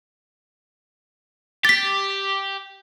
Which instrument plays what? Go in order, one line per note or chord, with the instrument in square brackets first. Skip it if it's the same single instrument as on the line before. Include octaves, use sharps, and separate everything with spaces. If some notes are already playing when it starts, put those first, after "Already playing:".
[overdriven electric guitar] G4 [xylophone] A6 B6